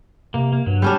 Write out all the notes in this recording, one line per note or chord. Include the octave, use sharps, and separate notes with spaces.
C3 A#3
A#3
G2 F#3
G3 C#4 D4